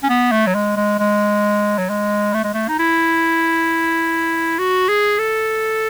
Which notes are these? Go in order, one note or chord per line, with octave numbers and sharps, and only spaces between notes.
C#4
B3
A3
F#3
G#3
G#3
G#3
F#3
G#3
A3
G#3
A3
D#4
E4
F#4
G#4
A4